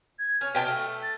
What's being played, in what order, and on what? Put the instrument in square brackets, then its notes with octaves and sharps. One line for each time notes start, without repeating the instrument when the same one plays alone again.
[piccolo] G#6
[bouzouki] C#4 [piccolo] F6
[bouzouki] B2 G5 A5
A3
[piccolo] A6